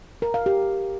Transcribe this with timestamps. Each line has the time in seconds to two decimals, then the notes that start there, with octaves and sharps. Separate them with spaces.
0.22 A#4
0.34 F5
0.46 G4